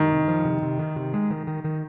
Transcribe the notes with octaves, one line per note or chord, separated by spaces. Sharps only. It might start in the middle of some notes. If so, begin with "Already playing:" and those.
Already playing: D#3
C3
F3
C3
C3
D#3
C3
G#3
D#3
D#3
D#3